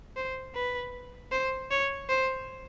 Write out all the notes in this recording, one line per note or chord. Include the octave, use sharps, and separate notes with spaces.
C5
B4
C5
C#5
C5